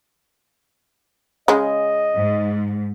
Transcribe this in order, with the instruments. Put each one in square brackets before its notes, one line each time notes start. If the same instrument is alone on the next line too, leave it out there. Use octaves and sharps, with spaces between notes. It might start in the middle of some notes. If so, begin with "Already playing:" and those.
[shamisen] C#3 G#3 [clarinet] D#5
[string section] G#2